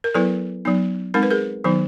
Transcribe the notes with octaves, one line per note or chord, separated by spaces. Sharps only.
A#4
F#3 B3 E4 A4 B4
F#3 B3 D#4
G#3 C4 D#4 A#4
B4
G#4 A#4
D#3 F#3 B3 D#4